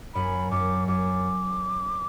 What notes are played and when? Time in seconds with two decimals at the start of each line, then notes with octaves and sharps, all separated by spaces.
0.14 F#2 B5
0.51 F#2 D6
0.88 F#2 D6